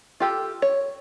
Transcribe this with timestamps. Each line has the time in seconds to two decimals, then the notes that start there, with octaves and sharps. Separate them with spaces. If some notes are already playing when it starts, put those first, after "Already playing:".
0.20 F4 G4 A4
0.62 C#5